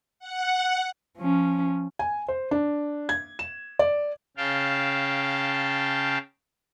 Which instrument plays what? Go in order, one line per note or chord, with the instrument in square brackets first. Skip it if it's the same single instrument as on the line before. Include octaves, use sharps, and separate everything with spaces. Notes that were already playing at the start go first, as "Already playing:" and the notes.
[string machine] F#5
[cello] F3 C#4
[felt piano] G#5
C5
D4
G#6
E7
D5
[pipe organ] C#3 F5 G5 A5